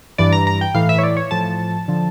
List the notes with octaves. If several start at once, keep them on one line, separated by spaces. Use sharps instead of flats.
G2 E3 D5
A#5
A#5
G5
A2 E3 F5
E5
C#5
D5
C#5
A2 F3 A5
D3 F3